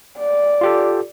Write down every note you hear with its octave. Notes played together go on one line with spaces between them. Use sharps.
D5
F4 G4 A4